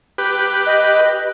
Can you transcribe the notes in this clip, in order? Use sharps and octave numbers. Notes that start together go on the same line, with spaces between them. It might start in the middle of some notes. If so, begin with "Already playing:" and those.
G4 B4
D#5